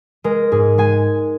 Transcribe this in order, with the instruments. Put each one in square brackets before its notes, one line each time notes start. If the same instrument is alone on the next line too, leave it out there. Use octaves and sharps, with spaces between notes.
[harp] G#3 A#4
G#2 G#4
G#3 G#5